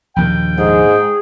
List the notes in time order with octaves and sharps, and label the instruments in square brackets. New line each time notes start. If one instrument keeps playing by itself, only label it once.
[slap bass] A#1 D#2 D#3 [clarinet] G5
[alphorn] G#2 [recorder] G#4